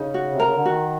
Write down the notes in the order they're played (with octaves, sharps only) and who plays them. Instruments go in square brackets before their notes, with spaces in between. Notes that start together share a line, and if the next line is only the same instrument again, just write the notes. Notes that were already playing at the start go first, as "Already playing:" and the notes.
Already playing: [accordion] C#3 [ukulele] D#4
[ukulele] F#4
[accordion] C3
[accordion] C#3 [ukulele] A#4
[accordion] D3
[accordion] D#3 [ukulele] F#4